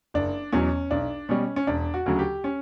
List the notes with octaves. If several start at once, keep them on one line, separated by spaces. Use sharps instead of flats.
F#1 D4
E2 B2 F#3 C#4
B1 D4
B2 G3 C#4
C#4
E1 D4
F#4
D2 C#3 F#3
G4
C#4